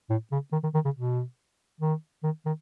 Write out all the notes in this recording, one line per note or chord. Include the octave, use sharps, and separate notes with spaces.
A2
C#3
D#3
D#3
D#3
C#3
B2
D#3
D#3
D#3